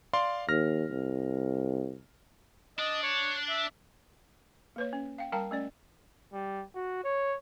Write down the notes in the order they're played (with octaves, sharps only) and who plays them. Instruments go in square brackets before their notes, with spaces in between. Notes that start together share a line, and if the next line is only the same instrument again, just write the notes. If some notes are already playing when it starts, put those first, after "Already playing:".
[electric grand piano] D5 F5 C6
[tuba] D#2 [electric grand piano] F6 A#6
[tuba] C2
[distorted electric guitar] D4 [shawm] D#5
[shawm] C#5
E5
[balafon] A#3 B4 C#5
C#4
F5 G5
G3 A#4 F5 G5 A5 A#5
A3 C#4 D5
[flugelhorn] G3
F#4
C#5